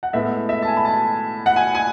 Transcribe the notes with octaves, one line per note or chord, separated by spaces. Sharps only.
F#5
A2 G#3 B3 E5
E5
A5
G#5
B5
A5
F#5
G#5
G#5